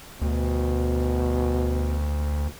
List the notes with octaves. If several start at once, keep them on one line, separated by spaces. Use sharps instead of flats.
D2 B2